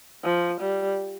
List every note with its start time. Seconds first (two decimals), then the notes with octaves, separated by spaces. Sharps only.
0.24 F3
0.61 G3